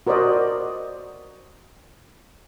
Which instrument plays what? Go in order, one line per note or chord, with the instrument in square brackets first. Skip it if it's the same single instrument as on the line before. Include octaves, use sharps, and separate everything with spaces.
[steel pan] F#4 A#4 C5 D5 D#5